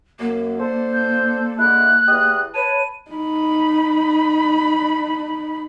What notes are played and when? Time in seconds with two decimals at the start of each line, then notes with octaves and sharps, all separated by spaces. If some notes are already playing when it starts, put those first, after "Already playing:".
0.19 F#2 A#3
0.59 D4 A4 C5
0.93 G6
1.59 D3 G#3 E4 F#6
2.08 E2 G4 D#6
2.55 B4 C#5 A5 D#7
3.11 D#4 B5